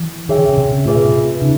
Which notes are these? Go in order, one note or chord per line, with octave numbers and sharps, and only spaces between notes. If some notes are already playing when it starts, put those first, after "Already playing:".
Already playing: E3
D#3 G#4 C#5 E5 G5
D3
C#3
C3
C#3
A2 F4 G#4 B4 E5
B2
C3
C#3 D#4